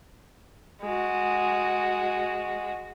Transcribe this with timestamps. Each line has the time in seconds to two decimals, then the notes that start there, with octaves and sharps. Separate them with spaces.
0.82 G#3 F#4